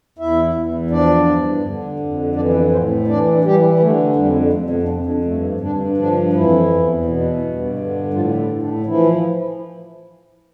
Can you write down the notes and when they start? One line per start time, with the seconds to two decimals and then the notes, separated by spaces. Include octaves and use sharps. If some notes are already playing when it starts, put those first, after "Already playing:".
0.18 E2 E4 E5
0.55 E2
0.91 F3 D4 D5
1.27 G2
1.63 D3
1.99 F2
2.35 E3 D4 D5
2.54 B3 B4
2.71 A2 C4 C5
3.07 E3 D4 D5
3.44 E3 G3 G4
3.80 D3 A3
4.16 F2 G3
4.53 F2 A3
4.70 B2 B3
4.83 D4
4.88 F2 C3 C4
5.06 D3 D4
5.25 G2 A3
5.60 G2 D3 D4
5.97 D3 F3 D4
6.33 F2 E3 E4
6.70 E2
7.05 B2
7.42 G2
7.78 D3
8.14 A2 F3 F4
8.38 E3 E4
8.50 A2
8.62 D3 D4
8.86 E3 F3 E4